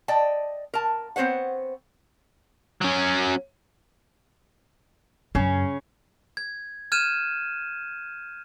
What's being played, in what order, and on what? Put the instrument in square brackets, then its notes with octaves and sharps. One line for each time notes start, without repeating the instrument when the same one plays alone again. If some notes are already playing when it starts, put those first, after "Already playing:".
[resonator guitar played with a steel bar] D5 D#5 G5 A5
A#4 A5
B3 C4 C5 C#5 F#5
[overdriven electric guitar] F#3 C#4
[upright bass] F#2 [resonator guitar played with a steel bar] C#3 C#4
[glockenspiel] G#6
F6 G6 G#6 D#7 E7